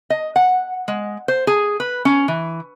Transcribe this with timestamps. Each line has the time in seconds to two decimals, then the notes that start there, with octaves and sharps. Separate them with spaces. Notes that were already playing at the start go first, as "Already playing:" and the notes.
0.10 D#5
0.36 F#5
0.88 G#3
1.28 C5
1.47 G#4
1.80 B4
2.05 C#4
2.28 E3